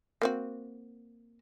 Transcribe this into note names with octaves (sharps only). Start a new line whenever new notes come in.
A#3 C4 F#4